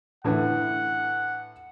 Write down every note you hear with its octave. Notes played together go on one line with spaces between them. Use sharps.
A2 D3 E3 F#5